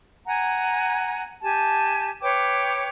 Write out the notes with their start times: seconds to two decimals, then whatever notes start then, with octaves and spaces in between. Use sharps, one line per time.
0.27 F#5 G#5 A#5
1.42 G4 G#5 A5
2.21 B4 C#5 G5 D6